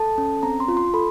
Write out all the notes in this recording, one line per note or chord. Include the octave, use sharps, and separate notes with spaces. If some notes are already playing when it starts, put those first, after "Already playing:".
Already playing: A4 A5
C#4
C4 A#5
C6
F4
C6
A4 B5